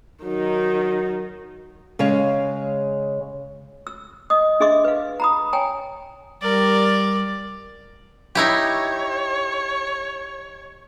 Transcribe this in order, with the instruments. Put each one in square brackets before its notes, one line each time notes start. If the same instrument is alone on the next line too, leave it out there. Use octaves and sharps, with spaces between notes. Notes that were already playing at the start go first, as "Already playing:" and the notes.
[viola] D#3 D#4 [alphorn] F#3
[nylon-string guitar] C#3 G#3 C#5 F5
[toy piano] E6
D#5 D#6
D4 G#4 D#5 E5 C6 D6
B4 F5
A#5 B5 D#6
C#5 G5 G#5 A#5
[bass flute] G3 [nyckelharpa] A#4 [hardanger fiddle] D5
[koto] D#4 E4 G4 [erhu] C#5